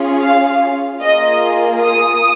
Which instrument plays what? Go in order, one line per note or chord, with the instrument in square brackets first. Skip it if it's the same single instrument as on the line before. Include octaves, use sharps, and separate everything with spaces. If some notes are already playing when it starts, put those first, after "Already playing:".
Already playing: [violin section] C#4 F4 G#4
F5
A#3 F4 G#4 D#5
D#6